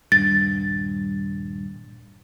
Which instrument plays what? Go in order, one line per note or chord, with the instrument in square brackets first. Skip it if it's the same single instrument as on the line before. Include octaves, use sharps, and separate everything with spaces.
[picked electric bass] D#1 G2 [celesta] A6